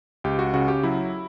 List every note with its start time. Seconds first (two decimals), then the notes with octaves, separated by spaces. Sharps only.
0.24 C#2 G4
0.39 F#4
0.54 C#3 F#4
0.68 G4
0.83 F#3 E4